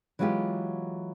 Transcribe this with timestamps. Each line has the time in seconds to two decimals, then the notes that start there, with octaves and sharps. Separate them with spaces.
0.19 E3 F#3 G#3 B3 F4 G4